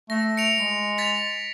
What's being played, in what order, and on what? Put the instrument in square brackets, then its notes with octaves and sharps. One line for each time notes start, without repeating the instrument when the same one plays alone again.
[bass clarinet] A3 [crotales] A#6
[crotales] C#7 D7 F7
[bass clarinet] G#3
[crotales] A6 B6 F7